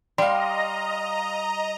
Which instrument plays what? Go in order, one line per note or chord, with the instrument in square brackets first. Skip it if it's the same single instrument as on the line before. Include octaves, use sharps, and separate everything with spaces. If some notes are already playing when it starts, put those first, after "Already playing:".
[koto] G3 [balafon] D5 [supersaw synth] D#5 A#5 [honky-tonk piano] F5 C6